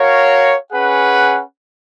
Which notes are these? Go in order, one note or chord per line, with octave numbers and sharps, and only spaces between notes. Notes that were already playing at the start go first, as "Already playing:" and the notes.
Already playing: F#4 A#4 C#5 F5
C#4 G#4 B4 F#5